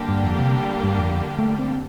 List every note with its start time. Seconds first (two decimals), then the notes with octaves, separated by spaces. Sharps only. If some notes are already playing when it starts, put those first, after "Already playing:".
Already playing: D3 G3 A#3 D4 G4
0.09 G2
0.24 F2
0.38 C3
0.84 G2
0.99 F2
1.39 A3
1.59 C4